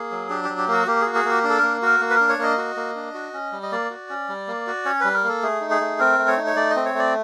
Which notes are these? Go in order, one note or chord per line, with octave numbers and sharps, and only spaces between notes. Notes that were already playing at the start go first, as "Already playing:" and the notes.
Already playing: A#3 G#4
F#3
D4 G4
G4
F#3
G4
A#3 F#4
A#3 G4
F#4 G#4
G#4
A#3 G4
D4
A4
A#3 A#4
F#4 A#4
A#3
B4
D4 A#4
C#5
A#3 D#5
F#4
A#3
D4
F#4
C#4
G3
D#5
A#3 D5
F#4
C#4
G3
A#3
F#4
C#4 C#5
G3 B4
A#4
A#3 A4
A3 G#4
D#4
G#4
A3
C4 A#4
A3
C#5
D#4
C#5
A3 D5
D#5
C4
C#5
A3 D5